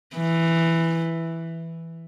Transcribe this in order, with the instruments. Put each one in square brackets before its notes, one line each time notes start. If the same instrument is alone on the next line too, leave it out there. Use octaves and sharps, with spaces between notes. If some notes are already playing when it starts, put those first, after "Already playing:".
[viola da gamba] E3